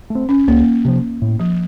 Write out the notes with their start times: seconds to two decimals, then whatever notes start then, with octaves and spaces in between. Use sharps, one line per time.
0.10 A3
0.15 C4
0.29 C#4
0.48 C#2 A#3
0.85 C3 F3
1.22 A2
1.39 F3